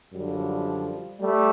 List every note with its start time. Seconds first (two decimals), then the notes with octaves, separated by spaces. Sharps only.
0.14 F#2 D3 F3 G3
1.20 G3 A3